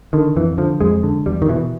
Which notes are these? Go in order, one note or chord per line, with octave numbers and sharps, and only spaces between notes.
D3 D#3
F2 E3
D3 F3
F2 G#3
D3
E2 G3
D#3
B2 E3